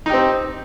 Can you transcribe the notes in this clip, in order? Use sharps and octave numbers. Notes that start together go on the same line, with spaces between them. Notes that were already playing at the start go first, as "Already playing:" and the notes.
C4 D#4 G4